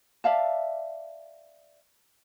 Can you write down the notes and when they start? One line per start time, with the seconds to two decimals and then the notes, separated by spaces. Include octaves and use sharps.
0.24 D5 E5 F5 A5